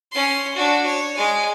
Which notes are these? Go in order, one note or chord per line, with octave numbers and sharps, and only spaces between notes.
C#4 C6
D4 F#4
C#5
G#3 G#5